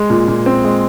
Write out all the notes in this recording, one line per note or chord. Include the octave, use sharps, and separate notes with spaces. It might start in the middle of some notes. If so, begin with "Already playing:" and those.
Already playing: G#3
A#2
A#2
C4
G#3